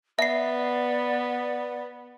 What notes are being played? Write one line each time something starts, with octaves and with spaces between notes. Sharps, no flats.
B3 D5 E5 C7